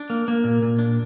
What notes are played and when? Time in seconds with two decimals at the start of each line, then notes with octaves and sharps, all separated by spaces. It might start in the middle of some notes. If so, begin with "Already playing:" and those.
Already playing: D4
0.10 A#3
0.28 A#3
0.44 A#2
0.62 A#2
0.79 D4